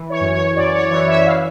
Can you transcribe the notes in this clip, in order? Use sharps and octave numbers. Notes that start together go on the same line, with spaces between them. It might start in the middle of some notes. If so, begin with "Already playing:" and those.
Already playing: E3
C#5
F#2
C#5
F#2 D5
C#5
E3 C#5
E5
E3 F5